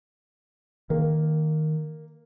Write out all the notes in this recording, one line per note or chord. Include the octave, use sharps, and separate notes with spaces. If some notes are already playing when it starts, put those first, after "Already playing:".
D#3 A#3